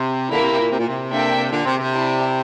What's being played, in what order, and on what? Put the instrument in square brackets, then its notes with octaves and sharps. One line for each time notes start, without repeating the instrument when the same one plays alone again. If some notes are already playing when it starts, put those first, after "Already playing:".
Already playing: [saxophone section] C3
[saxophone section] A#2 D3 [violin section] A#3 E4 A#4
[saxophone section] C3
C3
A#2
C3
A#2
C3
[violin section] A#3 D4 A4 E5 G5
[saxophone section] A#2 D3
C3
C3
[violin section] E4 G4 D5 A5